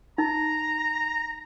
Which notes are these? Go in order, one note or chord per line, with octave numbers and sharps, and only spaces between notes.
D#4 A#5